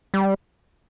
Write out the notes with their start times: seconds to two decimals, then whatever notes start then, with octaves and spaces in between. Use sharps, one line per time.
0.14 G3